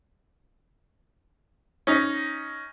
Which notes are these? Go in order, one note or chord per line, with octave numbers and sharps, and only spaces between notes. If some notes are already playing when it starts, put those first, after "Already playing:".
C#4 D#4